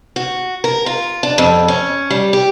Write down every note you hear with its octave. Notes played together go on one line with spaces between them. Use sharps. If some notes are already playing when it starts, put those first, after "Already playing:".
F#4
A#4
F4
D4
F2
C#4
G3
G4